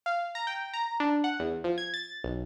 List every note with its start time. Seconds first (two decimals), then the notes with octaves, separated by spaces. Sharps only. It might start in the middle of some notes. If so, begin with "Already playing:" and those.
0.06 F5
0.35 A#5
0.47 G5
0.73 A#5
1.00 D4
1.24 F#5
1.40 E2
1.64 F3
1.78 G#6
1.94 A6
2.24 B1